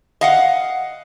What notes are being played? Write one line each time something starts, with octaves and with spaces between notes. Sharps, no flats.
D#5 F5 F#5